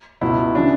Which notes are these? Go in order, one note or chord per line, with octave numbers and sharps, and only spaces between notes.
C#2 B2 E4
C#3 E3 D4